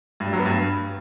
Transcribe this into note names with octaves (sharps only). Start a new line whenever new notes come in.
G2
G3
F#3
B3
G2